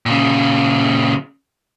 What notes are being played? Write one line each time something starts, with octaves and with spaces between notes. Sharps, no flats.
A#2 C#3